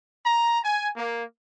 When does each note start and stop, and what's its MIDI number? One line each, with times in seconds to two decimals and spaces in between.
0.25 0.60 82
0.64 0.88 80
0.95 1.22 58